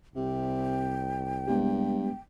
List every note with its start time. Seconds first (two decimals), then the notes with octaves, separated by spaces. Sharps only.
0.15 C2 C3 G5
1.47 G2 G#3 B3 G4